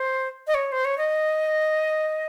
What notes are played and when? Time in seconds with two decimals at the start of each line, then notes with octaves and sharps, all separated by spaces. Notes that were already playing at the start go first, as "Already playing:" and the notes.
Already playing: C5
0.47 D#5
0.54 C#5
0.72 C5
0.85 C#5
0.98 D#5